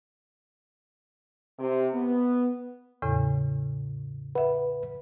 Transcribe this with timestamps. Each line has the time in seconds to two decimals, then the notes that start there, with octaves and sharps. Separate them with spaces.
1.59 C3
1.94 B3
3.02 E2 A2 C#3
4.35 B4 E5 F#5